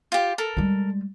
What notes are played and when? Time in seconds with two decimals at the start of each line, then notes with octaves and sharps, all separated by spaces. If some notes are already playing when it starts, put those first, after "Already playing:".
0.12 F4 G4
0.38 A4 A#4
0.57 G3 G#3